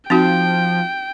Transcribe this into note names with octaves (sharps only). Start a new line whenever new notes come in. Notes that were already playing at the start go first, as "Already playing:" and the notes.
F3 C4 D#4 F#4 G5